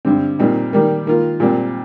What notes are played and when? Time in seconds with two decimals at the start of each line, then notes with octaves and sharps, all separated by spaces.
0.05 G2 D3 G3 C4
0.39 A#2 G3 C4 D#4
0.73 D#3 G3 A#3
1.07 D#3 A#3 F4
1.40 A#2 G3 C4